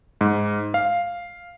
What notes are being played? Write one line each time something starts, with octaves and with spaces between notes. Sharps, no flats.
G#2
F5